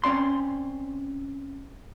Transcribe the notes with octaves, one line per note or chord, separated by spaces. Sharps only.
C4 C#4 D5 C6